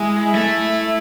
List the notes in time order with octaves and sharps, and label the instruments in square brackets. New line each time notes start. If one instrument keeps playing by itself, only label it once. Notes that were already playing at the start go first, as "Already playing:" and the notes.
Already playing: [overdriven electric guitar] G#3 [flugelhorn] E4
[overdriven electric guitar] A3